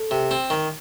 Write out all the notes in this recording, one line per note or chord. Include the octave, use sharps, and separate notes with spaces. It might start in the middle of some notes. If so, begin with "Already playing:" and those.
Already playing: A4
C3
C4
D#3